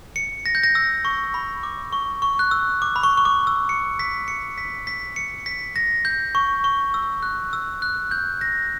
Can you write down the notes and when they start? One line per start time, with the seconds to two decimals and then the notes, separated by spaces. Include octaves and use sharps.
0.16 C#7
0.46 A#6
0.55 G6
0.63 A#6
0.75 E6
1.05 C#6
1.34 B5
1.63 D6
1.93 C#6
2.22 C#6
2.39 F#6
2.51 E6
2.82 D6
2.96 B5
3.03 C#6
3.17 C#6
3.25 D6
3.47 E6
3.69 C#7
3.99 B6
4.28 C#7
4.58 B6
4.87 B6
5.16 C#7
5.46 B6
5.76 A#6
6.05 G6
6.35 C#6
6.64 C#6
6.94 E6
7.23 F#6
7.53 E6
7.82 F#6
8.11 G6
8.41 A#6